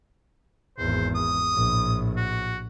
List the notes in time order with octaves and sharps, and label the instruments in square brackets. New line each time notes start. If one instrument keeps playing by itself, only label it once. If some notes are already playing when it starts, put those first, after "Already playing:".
[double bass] G#1 E2 [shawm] C5
[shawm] D#6
[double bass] A#1 A2
[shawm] F#4